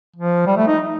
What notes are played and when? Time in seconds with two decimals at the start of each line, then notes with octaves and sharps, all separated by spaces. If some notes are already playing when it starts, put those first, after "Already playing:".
0.16 F3
0.47 G3
0.57 A3
0.68 D#4